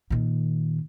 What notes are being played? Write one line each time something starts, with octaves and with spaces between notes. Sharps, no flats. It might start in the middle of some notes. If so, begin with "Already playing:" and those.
A#2 D#3